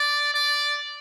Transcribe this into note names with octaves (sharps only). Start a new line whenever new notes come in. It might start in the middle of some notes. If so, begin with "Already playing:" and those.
Already playing: D5
D5